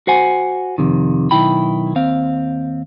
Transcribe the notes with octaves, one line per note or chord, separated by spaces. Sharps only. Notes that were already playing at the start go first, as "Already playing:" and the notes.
F#4 C5 F#5 G#5
F2 C3 D#3
B1 D#3 E4 G5 B5
D#2 C4 F5